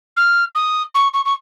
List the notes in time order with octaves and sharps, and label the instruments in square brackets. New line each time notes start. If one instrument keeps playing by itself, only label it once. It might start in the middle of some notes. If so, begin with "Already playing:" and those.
[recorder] F6
D#6
C#6
C#6
C#6